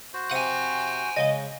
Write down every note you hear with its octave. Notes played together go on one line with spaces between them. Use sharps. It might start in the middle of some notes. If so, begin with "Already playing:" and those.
F#4 C5
C3 F#5 G#5 D#7
C#3 G#3 D#5